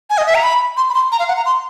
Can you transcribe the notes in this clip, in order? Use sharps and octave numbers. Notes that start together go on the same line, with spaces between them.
G#5
D#5
E5
A#5
B5
C6
B5
C6
A#5
F5
F#5
A#5
C6